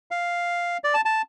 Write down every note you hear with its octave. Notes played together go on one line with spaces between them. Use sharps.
F5
D5
A5
A5